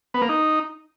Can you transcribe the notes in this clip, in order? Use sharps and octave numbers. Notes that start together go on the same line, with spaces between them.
B3
A#3
D#4